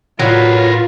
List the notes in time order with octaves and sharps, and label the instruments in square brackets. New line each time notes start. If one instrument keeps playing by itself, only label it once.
[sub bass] A2 [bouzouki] F#3 [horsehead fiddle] F4 [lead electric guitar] A#4 B4